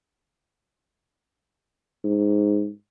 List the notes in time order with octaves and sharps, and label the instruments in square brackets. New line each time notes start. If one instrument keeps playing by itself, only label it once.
[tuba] G#2